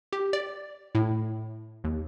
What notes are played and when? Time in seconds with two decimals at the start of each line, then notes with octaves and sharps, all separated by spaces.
0.13 G4
0.33 D5
0.95 A2
1.84 D#2